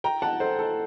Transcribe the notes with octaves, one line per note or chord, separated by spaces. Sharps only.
G5 A#5
F#5 A5
A4 C5
A4